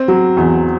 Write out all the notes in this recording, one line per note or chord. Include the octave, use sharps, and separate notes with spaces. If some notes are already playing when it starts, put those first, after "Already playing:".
Already playing: C4
F#3
E2